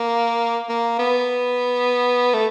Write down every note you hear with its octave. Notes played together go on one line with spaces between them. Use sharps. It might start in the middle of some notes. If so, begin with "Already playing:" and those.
Already playing: A#3
A#3
B3
A3